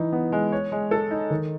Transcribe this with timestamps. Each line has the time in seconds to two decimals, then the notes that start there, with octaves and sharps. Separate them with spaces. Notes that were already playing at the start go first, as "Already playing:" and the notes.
Already playing: E3 D#4
0.12 B3
0.32 G#3
0.52 C#5
0.72 G#3
0.91 A4
1.11 D#4
1.30 D#3